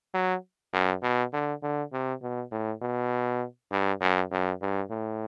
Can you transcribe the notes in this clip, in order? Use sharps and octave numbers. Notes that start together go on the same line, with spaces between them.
F#3
F#2
B2
D3
D3
C3
B2
A2
B2
G2
F#2
F#2
G2
A2